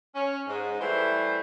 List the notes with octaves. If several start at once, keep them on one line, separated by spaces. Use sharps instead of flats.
C#4
G#2
E3 G3 A3 C5